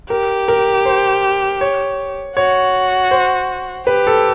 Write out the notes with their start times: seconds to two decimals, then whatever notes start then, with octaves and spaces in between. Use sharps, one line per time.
0.10 G4 A#4
0.48 A#4
0.86 C5
1.61 C#5
2.37 F#4 C#5
3.11 C5
3.87 G4 B4
4.07 A4